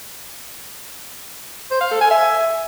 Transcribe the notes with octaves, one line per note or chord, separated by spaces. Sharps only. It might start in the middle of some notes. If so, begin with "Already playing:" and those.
C5
F5
A4
G#5
E5